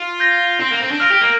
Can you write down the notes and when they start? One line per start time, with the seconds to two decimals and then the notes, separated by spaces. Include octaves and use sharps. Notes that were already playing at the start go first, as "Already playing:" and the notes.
Already playing: F4
0.20 G6 A#6 G7
0.60 C4
0.71 A#3
0.80 C4
0.91 D4
1.00 F4 F6 A#6 D7
1.11 G4
1.21 A#3